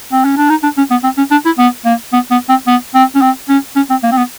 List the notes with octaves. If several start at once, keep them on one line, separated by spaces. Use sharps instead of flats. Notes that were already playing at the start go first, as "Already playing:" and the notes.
C4
C#4
D4
D#4
D4
C#4
B3
C4
C#4
D4
E4
B3
A#3
B3
B3
C4
B3
C4
C#4
C4
C#4
C#4
C4
A#3
C4
B3